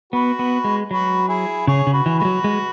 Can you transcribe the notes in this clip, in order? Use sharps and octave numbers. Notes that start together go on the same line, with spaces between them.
B3 F#4 B4
B3
G#3
F#3 F#4 B4
E4 G#4
C#3 G#4 C#5
C#3
F#4 B4
E3
G#3 F#4 B4
F#3
G#3